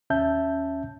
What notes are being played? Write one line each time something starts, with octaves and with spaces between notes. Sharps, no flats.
D#2 C#4 E5 A5 G6